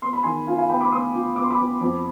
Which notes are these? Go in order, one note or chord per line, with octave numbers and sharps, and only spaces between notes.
B3 C6
B5
D#3 G#5 C6
F4 F5 G#5
F5 G#5
B3 G5 B5
B5 D6
B3 C6 D#6
F4
B3 D6
C6
B5 D6
B3
F2